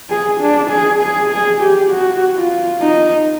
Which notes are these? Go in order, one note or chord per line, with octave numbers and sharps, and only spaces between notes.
G#4
D4
G#4
G#4
G#4
G4
F#4
F4
D#4